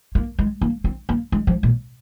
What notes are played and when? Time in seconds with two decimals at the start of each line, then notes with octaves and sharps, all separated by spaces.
0.15 A#3
0.39 G#3
0.61 A#3
0.84 C4
1.09 A#3
1.32 G#3
1.47 F3
1.63 A#2